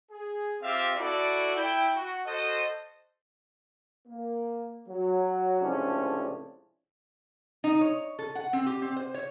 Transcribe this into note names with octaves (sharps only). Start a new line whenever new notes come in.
G#4
C4 F4 G4 E5 F5
E4 F#4 A4 D5
E4 G5
F#4
F#4 A4 C5 D#5
A#3
F#3
C#2 A2 C3 F3 C#4 D4
D#4
C#5
A4
F#5
C4
G4
C4
C5
C#5